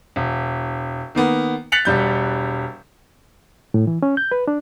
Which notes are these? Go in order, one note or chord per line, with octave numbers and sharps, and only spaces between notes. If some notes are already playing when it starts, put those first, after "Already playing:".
E1
D#3 A#3 B3
F#6 A6 B6 C#7 F7 F#7
E1 G3 G6
A2
E3
C#4
G6
B4
D4